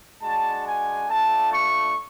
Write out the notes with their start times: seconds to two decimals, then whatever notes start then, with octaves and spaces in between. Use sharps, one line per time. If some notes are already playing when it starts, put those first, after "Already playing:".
0.22 G#3 D4 F#4 A5
0.66 G#5
1.09 A3 D4 F4 A5
1.51 C#6